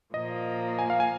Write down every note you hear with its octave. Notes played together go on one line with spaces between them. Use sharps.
A#2 F3 A#3 D#5
G#5
F5
G#5